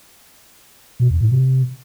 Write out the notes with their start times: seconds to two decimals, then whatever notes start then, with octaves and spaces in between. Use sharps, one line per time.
1.00 B2
1.10 E2
1.21 A2
1.32 C3